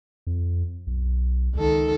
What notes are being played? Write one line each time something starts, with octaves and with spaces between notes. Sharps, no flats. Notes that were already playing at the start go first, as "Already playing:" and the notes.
F2
B1
C#2 D#3 A4